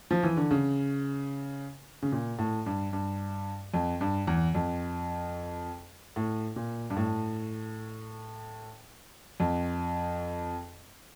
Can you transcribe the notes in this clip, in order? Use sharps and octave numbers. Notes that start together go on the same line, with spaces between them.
F3
E3
D3
C#3
C#3
A#2
A2
G2
G2
F2
G2
E2
F2
A2
A#2
G2
A2
F2